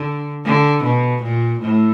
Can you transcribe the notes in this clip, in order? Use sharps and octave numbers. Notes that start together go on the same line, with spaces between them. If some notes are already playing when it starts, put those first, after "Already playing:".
Already playing: D3
D3
B2
A#2
A2